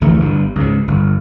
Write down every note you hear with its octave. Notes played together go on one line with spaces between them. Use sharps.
F1 D2 E3 A3
G1 G2
C#2 G#2
G1